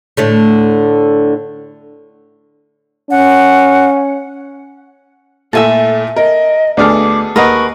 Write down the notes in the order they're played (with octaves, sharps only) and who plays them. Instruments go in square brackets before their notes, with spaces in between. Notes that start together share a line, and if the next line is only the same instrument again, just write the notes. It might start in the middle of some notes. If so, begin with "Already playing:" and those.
[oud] A2 D3 A3
[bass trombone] C#4 [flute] F#5
[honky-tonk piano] A#2 A3 E4 [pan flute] A4 [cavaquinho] E5 G#5 A5
[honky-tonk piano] A#4 [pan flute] D#5
[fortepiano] D2 D5 F6 [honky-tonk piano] B3 G#4 A4 [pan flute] D6
[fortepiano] D#2 D#5 [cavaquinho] A#4 B4 F#5 [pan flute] C#6